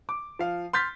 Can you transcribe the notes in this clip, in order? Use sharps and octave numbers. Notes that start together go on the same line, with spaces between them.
D6
F3 F5
C6 F6 G6 A6 B6